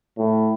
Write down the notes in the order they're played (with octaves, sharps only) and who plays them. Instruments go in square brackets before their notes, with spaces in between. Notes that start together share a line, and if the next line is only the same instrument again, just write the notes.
[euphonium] A2